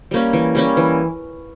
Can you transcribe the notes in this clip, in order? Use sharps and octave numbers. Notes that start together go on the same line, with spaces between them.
G3 A#3 C#4
E3
G3 A#3 C#4
E3